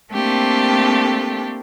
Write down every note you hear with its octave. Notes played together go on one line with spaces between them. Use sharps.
A3 A#3 C4 D4 G4 A4